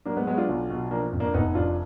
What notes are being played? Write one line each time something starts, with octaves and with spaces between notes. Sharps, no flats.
F#3 A#3 D4
G#3 B3
F#3 G#3 B3
D4 F4
B1
B2
F3 A#3 D4
F2
A#3 D4
F1 B3 D#4
F2 D4 F4